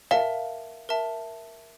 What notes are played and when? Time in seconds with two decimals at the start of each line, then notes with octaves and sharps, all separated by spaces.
0.11 A#4 E5 F5 A5
0.89 A#4 E5 A5